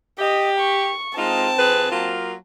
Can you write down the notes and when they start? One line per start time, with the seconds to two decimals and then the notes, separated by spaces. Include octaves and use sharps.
0.19 G4 D#5
0.59 C#6
1.17 G#3 C4 D#4 F4 A5
1.58 F2 G#4 B4
1.90 F#3 A#3 F4